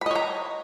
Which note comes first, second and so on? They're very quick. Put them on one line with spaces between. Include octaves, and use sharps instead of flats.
B5 D#5 C#5 A#5